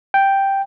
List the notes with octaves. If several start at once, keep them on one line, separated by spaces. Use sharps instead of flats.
G5